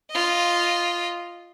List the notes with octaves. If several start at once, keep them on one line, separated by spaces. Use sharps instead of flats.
F4 D#5